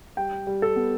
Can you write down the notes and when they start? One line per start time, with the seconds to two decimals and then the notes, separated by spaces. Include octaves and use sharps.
0.17 G3 G5
0.47 G3
0.62 A4
0.76 B3